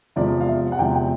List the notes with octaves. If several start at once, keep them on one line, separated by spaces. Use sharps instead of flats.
E2 C3 F3 G#3 D5
F5
E5
F#5
E2 C3 F3 G#3 G5
G5